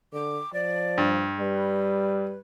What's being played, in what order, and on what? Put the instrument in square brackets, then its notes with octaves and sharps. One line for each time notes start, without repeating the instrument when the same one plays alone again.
[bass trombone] D3 [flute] D6
[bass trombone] F3 [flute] D5
[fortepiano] G2
[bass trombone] G3 [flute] B4